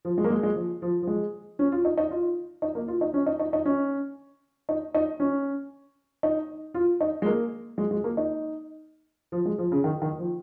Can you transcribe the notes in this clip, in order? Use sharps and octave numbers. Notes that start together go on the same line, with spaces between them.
F3
G#3
A#3
G#3
G#3
F3
F3
F3
G#3
C#4
F4
D#4
D#4
F4
D#4
A#3
F4
D#4
C#4
D#4
D#4
D#4
C#4
D#4
D#4
C#4
D#4
F4
D#4
G#3
A#3
G#3
G#3
A#3
D#4
F3
G#3
F3
C#3
D#3
D#3
F3